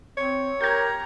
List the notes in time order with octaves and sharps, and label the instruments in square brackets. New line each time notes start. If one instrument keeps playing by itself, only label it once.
[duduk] C4 [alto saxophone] C#5
[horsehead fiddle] G4 A#5 [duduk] A#4 [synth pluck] G6 G#6